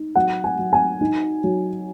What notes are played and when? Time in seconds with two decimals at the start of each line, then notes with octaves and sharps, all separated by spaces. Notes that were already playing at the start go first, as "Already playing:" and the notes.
Already playing: D#4
0.15 F#3 F#5
0.44 G#5
0.59 F#3
0.73 G#5
1.01 D#4
1.44 F#3